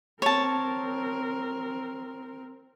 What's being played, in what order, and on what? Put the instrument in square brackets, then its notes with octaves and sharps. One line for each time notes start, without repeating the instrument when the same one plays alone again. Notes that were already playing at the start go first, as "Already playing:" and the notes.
[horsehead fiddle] C4 A#4 [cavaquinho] C#5 A5